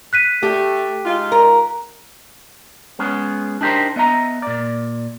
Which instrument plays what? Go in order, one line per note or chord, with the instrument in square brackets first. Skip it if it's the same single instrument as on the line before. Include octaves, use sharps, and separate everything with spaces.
[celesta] F#6 B6 D#7
[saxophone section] A3 [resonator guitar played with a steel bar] G4
[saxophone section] G#3 D#4 F4
[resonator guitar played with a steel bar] A#4
[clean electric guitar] G#3 B3 C#4 G#4
D4 D#4 G4 A#4 C5
B3 D#5 E5 A#5
A#2 D5